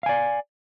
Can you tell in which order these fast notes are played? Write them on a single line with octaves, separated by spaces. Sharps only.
F5 G#5 D5